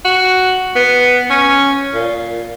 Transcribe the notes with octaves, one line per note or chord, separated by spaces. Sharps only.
F#4
B3
C#4
A#2